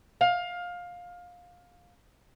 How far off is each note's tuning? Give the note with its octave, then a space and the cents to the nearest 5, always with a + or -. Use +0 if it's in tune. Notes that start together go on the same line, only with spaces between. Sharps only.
F5 +20